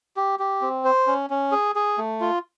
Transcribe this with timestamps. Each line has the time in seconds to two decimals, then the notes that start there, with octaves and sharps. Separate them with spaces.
0.16 G4
0.39 G4
0.61 C4
0.85 C5
1.07 C#4
1.30 C#4
1.52 G#4
1.76 G#4
1.98 A3
2.21 F4